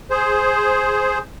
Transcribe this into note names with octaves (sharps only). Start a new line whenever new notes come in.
G#4 C5